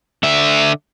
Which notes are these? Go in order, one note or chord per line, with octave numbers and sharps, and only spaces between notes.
D3 E5